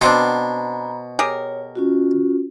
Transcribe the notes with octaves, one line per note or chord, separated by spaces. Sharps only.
B2 B3 C4 D4 C5 A#5 B5
G4 G#4 A#4 C#5
C#4 F4 F#4